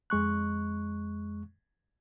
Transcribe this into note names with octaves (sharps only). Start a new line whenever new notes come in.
F2 G#3 C#6 F#6